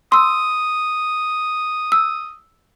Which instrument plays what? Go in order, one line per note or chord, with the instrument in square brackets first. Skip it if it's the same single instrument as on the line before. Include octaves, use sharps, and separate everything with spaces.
[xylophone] C6 E6 [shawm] D#6
[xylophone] E6